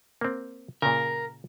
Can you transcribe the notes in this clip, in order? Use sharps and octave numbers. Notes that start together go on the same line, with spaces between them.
A#3 C4
A#2 C#3 A#4